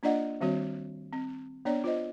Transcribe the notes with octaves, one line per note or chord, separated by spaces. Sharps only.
A#3 D4 F4 D5 D#5 F#5
D#3 G3 C4 F#4 C#5
C4
B3 D4 C#5 D5
F4 C5 D#5